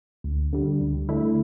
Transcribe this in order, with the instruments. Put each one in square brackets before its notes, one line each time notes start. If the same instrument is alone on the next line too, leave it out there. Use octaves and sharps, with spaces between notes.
[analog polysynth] D2
D3 G3
D2
D3 A3 E4